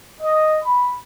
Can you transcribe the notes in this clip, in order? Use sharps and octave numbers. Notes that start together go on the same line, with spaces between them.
D#5
B5